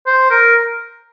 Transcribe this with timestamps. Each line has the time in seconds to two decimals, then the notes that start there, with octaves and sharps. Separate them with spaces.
0.06 C5
0.31 A#4